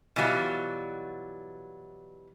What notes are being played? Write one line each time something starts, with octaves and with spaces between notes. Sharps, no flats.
B2 E3 F#3 G3 F4 F#4